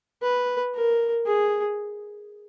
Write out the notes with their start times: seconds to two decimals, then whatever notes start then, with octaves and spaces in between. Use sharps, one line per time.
0.22 B4
0.74 A#4
1.26 G#4